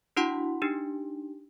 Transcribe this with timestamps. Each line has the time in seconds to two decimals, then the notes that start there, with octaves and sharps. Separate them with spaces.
0.17 D4 E4 F#4 F#5 C6
0.62 D4 D#4 G4